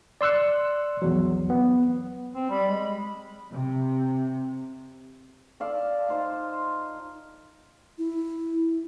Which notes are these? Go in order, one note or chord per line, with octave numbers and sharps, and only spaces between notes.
D5 C6 E6 F#6 C#7
A#1 E2 F#3
B3
C4
G3 B5
G#3
C3
A4 D5 F5
D#4 F4 C5
E4